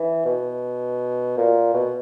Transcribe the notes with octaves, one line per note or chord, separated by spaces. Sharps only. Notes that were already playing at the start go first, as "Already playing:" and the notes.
Already playing: E3
B2
A#2
B2